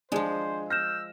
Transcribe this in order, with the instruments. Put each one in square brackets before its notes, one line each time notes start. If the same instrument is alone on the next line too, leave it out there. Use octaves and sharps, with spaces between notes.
[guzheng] F3 G#3 [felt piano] D4 G#4 [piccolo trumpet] C5
[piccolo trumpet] E6 [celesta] F6 G6 E7 [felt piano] A#6